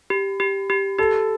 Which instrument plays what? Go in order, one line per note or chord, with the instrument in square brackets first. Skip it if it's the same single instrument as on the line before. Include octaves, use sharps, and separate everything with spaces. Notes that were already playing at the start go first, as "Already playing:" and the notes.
[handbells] G4
G4
G4
[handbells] G4 [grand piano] A4